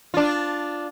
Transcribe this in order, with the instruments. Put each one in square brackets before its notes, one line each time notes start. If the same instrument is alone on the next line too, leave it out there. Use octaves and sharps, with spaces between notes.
[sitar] D4 F4